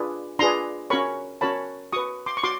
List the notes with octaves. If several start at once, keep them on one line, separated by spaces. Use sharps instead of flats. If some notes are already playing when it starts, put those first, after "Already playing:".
Already playing: D4 F4 G#4 B4
D4 F4 G#4 B4 A#5 C6
C#4 F#4 A#4 C#5 B5 C#6
C#4 F#4 A#4 C#5 A5 B5
F#4 B4 C#6 D#6
C6 D6
C#6
F#4 C6 D6